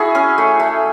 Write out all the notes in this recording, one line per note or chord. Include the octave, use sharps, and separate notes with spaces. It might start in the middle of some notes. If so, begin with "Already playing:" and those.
Already playing: E4 F#4 G#4
C#4
A3
A3